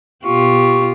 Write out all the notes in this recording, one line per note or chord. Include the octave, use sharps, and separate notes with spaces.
B2 F4 G4 C#6